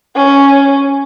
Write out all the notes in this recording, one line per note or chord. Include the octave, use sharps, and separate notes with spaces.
C#4